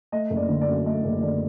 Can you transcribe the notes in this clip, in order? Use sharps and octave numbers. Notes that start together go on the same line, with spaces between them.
A3 D#5
F#1
D5
D3
D5
F#2
A3 D#5
F#1
D3 D5